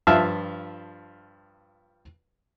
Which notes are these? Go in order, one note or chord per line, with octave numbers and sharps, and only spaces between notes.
G2 F3 E5 F5 A5 F6